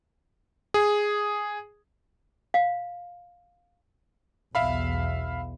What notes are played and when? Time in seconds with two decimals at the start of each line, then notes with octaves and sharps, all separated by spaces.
0.74 G#4
2.54 F5
4.55 B1 E2 E5 F5 B5